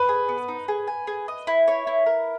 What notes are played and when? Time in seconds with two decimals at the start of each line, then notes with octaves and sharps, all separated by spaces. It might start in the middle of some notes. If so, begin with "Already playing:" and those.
Already playing: B4
0.09 G#4
0.29 B3
0.48 D#4
0.68 G#4
0.88 G#5
1.07 G#4
1.28 D#5
1.47 E4
1.68 C#5
1.87 E4
2.06 A#4